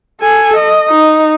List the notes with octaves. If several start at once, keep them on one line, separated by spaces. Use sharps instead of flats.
A4 G#5
D#5
D#4